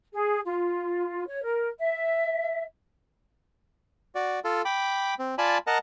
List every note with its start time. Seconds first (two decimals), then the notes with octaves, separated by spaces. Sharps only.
0.13 G#4
0.45 F4
1.27 C#5
1.44 A#4
1.79 E5
4.15 F#4 D5
4.45 F4 A4
4.65 G5 B5 D6
5.19 C4
5.38 F4 D5 G#5 A5 B5
5.67 A#4 D#5 F#5 A5 A#5